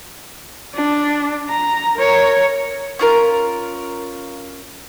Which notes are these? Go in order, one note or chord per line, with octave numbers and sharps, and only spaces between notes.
D4
A#5
A#4 C#5
C#4 F4 A#4